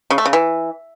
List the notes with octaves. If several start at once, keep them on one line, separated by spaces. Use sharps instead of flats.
C#3
A3
C#3
E3